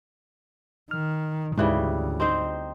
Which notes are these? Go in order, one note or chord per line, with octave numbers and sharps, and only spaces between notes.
D#3 F6
D2 G#2 C#3 E3 G3 F#6
C4 D#4 C5